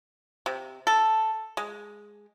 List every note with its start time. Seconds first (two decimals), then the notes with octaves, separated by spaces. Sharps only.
0.46 C3
0.87 A4
1.57 G#3